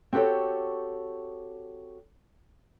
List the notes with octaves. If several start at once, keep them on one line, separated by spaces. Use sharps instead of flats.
C4 F#4 G4 A4 C#5